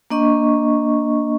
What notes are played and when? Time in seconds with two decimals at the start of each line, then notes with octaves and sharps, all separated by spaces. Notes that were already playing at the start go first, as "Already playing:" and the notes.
0.10 A#3 D4 D#5 C#6